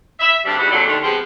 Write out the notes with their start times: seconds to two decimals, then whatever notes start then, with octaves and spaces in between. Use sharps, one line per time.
0.20 E5
0.45 D2 G2 C3 G3 D4
0.58 E2 G3 D#4 E4 F#4 D#5
0.71 F2 A#2 D3 F#3 A4 D5
0.87 D#2 D3 D#3 A3 D4 F4
1.03 F3 G#3 B3 C4 F4 G4